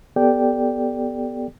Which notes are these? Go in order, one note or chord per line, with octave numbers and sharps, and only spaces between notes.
B3 G4 A4 D5 G5